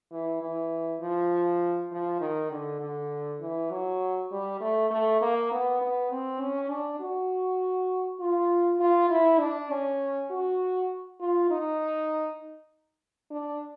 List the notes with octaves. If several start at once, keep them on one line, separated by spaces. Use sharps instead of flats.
E3
E3
F3
F3
D#3
D3
D3
E3
F#3
G3
A3
A3
A#3
B3
B3
C4
C#4
D4
F#4
F4
F4
E4
D4
C#4
F#4
F4
D#4
D4